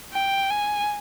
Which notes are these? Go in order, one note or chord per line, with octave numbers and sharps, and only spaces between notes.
G5
G#5